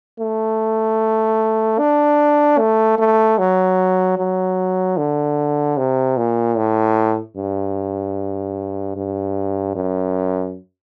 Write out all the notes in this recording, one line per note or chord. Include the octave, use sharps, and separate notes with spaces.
A3
D4
A3
A3
F#3
F#3
D3
C3
A#2
A2
G2
G2
F#2